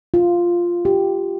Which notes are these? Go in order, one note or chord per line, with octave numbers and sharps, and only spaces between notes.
F4
G4